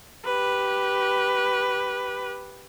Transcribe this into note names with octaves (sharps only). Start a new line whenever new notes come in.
G4 B4